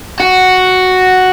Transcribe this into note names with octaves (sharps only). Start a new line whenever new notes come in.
F#4